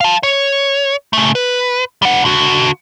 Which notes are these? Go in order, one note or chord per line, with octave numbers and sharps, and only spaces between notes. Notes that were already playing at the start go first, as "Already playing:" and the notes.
F5 A5
C#5
C#3 A3
B4
G3 F#5
D3 F#4